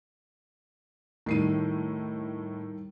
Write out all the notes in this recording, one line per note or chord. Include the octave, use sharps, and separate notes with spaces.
D#2 A2 D#3 G3 C7 D#7